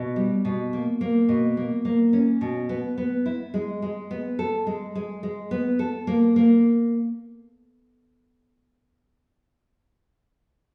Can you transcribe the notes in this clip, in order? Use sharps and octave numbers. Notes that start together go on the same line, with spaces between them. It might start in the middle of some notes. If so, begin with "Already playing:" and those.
Already playing: B2
G3
B2
A#3
A#3
B2
A#3
A#3
C#4
B2
B3
B3
E4
G#3
G#3
B3
A4
G#3
G#3
G#3
B3
A4
A#3
A#3